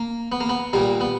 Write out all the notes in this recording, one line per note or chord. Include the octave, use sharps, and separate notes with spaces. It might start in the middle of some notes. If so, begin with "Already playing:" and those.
Already playing: A#3
B3
A#3
B3
A#2 G3 A#3
B3